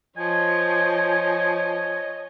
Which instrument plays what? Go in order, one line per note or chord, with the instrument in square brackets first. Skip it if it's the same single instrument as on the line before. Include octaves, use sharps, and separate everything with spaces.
[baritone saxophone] F3 [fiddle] C#5 D#5 [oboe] G#5